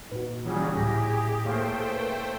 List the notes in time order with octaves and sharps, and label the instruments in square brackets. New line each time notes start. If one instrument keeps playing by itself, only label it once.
[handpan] A#2 D#4 [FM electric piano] F#4 B4
[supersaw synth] C#3 F#3 G3 [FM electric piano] E3 F4 [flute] G#4
[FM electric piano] C#2 A2 A#6 [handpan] E4 [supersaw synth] G4
[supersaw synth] A3 C5 G5 [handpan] A#3 C#5 F5
[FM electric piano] A#4 B4